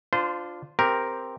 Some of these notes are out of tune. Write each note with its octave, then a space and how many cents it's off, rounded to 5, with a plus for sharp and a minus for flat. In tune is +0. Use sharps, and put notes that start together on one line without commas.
D4 +0 F4 +0 C5 -25
C4 +0 G4 +0 A#4 +0